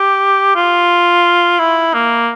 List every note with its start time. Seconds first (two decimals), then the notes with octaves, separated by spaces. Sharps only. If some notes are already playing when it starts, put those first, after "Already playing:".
Already playing: G4
0.56 F4
1.59 E4
1.94 A#3